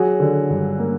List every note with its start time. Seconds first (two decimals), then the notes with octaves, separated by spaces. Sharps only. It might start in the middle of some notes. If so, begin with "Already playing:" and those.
Already playing: F#3 F#4 G#4
0.20 D3
0.50 G2
0.79 A#3